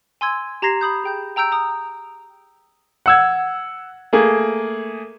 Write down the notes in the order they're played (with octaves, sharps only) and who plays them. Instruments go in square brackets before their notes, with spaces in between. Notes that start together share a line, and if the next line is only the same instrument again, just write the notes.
[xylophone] G#5 C6 E6 G#6
G4 A#5 C6 G#6 A#6 C7
B5 D#6 G6
G#4 G5 G6
G5 A#5 E6 G6 D7
A#5 D#6
[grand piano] F#5 E6 G#6
A3 A#3 G#4